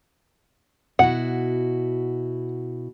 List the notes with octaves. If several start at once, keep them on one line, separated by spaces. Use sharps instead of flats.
B2 E4 F#4 F#5